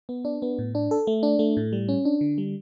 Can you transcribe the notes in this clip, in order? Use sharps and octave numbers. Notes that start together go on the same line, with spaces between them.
B3
D4
B3
A2
D4
A4
A3
D4
A3
A2
G3
C#4
D4
D3
G3